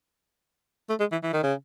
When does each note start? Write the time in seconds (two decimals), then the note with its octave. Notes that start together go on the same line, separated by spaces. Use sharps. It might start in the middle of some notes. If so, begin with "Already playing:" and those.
0.89 A3
1.00 G#3
1.12 E3
1.23 E3
1.33 D#3
1.43 C#3